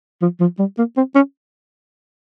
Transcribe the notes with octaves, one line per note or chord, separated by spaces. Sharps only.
F3
F3
G3
A#3
C4
C#4